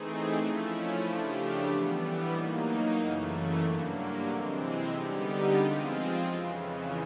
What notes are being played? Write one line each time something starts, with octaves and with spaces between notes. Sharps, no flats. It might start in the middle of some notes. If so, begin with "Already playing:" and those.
Already playing: E3 A3 C4 D#4 G#4
F3 A3 C#4 E4
C#3 F3 A3 D4 G4
A2 E3 G3 B3
F#3 A#3 D#4
F#2 C#3 E3 A3
G2 D3 F#3 A#3
C3 E3 G#3 C4
D3 G3 B3 D#4 G4
F3 G#3 C4 F4
F2 C#3 E3